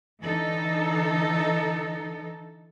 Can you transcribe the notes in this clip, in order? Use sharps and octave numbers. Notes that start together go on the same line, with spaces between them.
D3 E3 D#4 A4